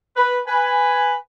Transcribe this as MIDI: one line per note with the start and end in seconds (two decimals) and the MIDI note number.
0.16 0.38 71
0.46 1.13 71
0.46 1.13 80